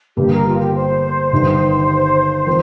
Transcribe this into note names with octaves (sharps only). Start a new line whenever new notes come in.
G1 G2 G3 A#3 G4
A#4
F4
G4
C5
G1 G2 D#3
F3 C4 A#4